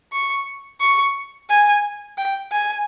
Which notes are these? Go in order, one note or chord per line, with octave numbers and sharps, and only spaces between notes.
C#6
C#6
G#5
G5
G#5